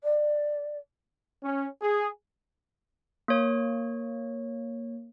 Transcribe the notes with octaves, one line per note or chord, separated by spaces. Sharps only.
D5
C#4
G#4
A#3 C#5